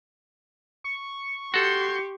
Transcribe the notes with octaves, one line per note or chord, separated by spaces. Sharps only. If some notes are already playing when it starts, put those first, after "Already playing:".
C#6
F#4 G4 A4 C6 G6